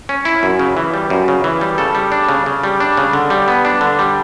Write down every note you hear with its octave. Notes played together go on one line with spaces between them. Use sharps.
C#4
E4
F#2
C#3
E3
G3
F#2
C#3
E3
G3
C#3 A4
G3
D4
C#3
C#3
G3
D4
C#3
D3
G3
B3
D4
D3
G3